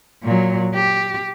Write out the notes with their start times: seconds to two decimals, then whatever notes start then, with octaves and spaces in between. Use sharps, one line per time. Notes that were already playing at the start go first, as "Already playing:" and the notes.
0.23 A#2 F#3
0.75 G4